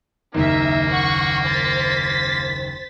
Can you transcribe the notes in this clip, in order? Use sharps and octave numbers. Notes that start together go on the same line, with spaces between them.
F#1 D#2 D#3 A#3 D#4 E5
F#5 C#6
C5 A6 B6